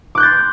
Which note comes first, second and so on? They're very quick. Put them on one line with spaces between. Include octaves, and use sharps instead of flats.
D6 F#6 G6 A6 C6